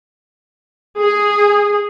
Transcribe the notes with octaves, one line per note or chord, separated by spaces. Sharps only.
G#4